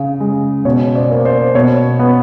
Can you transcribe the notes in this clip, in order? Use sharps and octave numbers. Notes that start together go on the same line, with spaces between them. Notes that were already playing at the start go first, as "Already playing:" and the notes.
Already playing: C#3
G#3
B2 C#5
C5 D5
A#3
C5 D5
B2 C#5
B3